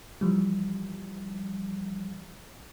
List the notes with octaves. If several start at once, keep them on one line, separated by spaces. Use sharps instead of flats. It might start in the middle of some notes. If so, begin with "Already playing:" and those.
E3 F3 G3